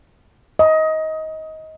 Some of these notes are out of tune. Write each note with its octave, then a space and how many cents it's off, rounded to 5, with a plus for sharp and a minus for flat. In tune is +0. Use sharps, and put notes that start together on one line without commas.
D#5 +20